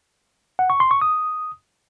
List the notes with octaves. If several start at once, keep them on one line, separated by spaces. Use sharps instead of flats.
F#5
C#6
C6
C#6
D#6